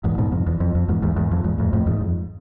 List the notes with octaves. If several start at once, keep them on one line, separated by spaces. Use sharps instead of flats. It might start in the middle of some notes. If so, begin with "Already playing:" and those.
E2 G#2
G#2 B2
F2
E2
F2
F2
E2 G#2
E2 G#2
E2 G#2
F2
E2 G#2
F2 A2
F2 A2
E2 G#2
F2